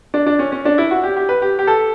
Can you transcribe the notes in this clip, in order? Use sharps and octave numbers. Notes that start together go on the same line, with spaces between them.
D4
D4
C#4
C#4
D4
E4
F#4
G4
G4
B4
G4
G4
A4